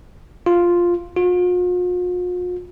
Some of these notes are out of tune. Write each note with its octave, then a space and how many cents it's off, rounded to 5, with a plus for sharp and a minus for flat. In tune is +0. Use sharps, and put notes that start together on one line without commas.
F4 +0
F4 +45